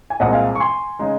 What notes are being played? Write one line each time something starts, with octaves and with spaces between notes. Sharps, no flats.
G#5
C2 A#2 G#3 C4 D#5 F#5
F5 G#5
C#6
G#5 C6
C#3 G#3 D#4